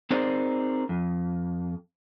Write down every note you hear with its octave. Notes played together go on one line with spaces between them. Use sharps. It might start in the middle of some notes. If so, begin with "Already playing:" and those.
C4 D#4 G#4 A#4 C5 D5
F2